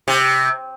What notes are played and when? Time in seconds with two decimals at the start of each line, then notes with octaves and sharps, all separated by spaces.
0.08 C3